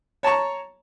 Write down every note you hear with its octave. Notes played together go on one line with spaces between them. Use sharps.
C#5 A5 A#5 C#6